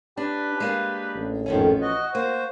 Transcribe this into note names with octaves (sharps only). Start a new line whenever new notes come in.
D4 G4 B4
G#3 A#3 D4
A1
F2 G#2 D#3 F3 B3 C#4
F#4 D#5
A#3 C5